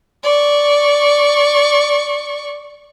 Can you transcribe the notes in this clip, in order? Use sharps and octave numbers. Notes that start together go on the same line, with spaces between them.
D5 C#6